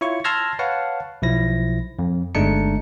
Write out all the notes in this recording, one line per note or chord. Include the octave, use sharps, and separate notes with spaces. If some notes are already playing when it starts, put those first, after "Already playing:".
E4 F4 C#5 C#6
A5 C6 E6 F6 G#6 A#6
B4 C#5 F5 F#5 A5
B1 F3 E4 A#6
F2
G1 G#3 A3 D4 D#4 C#7